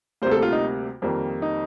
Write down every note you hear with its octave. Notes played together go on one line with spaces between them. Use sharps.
D2 C3 G3 A#3 C5
A4
F4
D#4
F2 D#3 G3 A#3
D#4